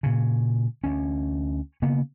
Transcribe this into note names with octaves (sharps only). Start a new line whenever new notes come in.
A#2 C#3
D2 C#4
C#3 A#3 B3